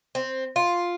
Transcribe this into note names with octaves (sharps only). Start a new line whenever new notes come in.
C4
F4